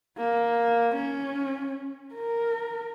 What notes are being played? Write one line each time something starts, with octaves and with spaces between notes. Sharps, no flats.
A#3
C#4
A#4